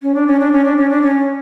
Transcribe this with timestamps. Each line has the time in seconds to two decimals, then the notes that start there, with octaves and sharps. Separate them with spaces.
0.02 C#4
0.14 D4
0.27 C#4
0.40 D4
0.52 C#4
0.65 D4
0.77 C#4
0.89 D4
1.02 C#4